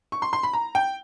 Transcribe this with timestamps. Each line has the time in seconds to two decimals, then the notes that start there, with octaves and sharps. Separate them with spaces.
0.12 C#6
0.22 C6
0.33 C6
0.43 B5
0.53 A#5
0.75 G5